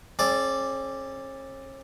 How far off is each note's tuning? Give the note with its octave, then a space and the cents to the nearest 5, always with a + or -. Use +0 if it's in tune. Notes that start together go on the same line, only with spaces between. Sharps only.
C#4 -45 G#4 +45 D5 +0